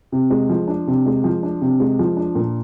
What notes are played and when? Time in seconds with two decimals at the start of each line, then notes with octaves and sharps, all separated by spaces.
0.12 C3
0.30 G#3
0.50 F3
0.68 D4
0.87 C3
1.06 G#3
1.24 F3
1.43 D4
1.61 C3
1.80 G#3
1.99 F3
2.17 D4
2.35 A#2